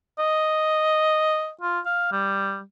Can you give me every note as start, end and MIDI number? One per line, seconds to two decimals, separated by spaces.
0.19 1.50 75
1.61 1.80 65
1.86 2.11 77
2.12 2.61 55